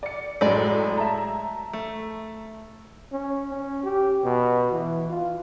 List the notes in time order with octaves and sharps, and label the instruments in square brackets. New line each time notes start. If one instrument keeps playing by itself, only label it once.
[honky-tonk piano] D5 C#7
[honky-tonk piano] F#2 A2 [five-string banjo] G#3 D5
[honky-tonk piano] E5 A5 A#5
[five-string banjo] A3
[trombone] C#4
C#4
G4
B2
E3
F4